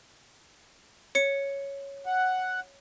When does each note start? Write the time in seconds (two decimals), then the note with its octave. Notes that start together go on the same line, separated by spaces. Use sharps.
1.15 C#5 C#7
2.06 F#5